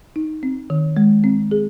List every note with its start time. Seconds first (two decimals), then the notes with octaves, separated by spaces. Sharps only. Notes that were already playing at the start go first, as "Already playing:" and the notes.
0.16 D#4
0.43 C4
0.70 D#3
0.97 G#3
1.24 C4
1.51 G#4